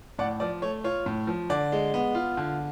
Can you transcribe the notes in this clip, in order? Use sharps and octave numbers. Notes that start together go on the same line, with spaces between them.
A2 D5 F#5
F3 D5
A3 C#5
F4 C#5
A2
F3
D3 D5
G#3
B3
F4
D3